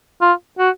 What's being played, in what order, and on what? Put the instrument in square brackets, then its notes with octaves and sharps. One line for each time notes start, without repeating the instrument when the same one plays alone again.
[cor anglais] F4
F#4